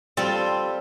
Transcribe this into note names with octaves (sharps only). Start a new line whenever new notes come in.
G3 C4 F4 A4